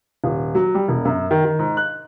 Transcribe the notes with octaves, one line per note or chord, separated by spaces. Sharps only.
D#1
F#3
G3
E1
F#2
D#3
D#3
G#2
F#6